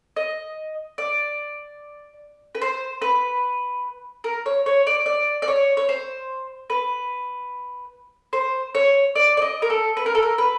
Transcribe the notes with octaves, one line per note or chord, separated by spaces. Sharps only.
D#5
D5
B4
C5
B4
A#4
C#5
C#5
D5
D5
D5
C#5
C#5
C5
B4
C5
C#5
D5
D5
D#5
A#4
A4
B4
A#4
A4
A#4
B4